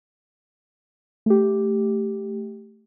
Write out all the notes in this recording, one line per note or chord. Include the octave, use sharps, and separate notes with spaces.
A3 G4